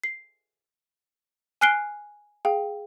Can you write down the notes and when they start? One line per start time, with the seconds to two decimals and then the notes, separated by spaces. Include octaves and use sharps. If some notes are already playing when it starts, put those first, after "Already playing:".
0.04 C7
1.61 G#5 F6 F#6 C7 D7 G7
2.45 G#4 F5 G5